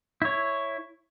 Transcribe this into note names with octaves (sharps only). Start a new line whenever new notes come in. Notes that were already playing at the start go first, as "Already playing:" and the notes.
E4 C#5